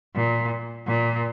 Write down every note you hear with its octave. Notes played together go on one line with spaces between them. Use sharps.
A#2
A#2